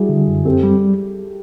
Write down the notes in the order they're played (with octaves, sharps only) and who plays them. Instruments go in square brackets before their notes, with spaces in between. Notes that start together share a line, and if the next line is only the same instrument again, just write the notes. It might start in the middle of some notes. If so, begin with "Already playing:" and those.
Already playing: [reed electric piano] G3 [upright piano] E4 F#4 G#4
[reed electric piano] D3
F#2
[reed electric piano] C4 [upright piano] G4 A4
[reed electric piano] G3